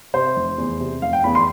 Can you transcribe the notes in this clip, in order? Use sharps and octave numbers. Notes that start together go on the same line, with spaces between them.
C3 C5
F1
E2
C3
F1 F5
G5
E2 B5
C6